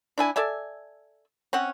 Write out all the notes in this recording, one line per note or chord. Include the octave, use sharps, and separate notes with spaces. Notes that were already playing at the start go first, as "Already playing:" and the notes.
D4 E4 G#5
A4 D5 E5 G#5
C4 C#4 F#5